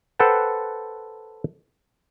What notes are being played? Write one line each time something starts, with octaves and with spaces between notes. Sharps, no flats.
A4 B4 C5 F#5 G5 A5